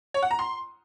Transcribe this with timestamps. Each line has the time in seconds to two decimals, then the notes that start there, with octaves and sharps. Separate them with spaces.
0.14 C#5
0.23 F#5
0.31 A#5
0.39 C6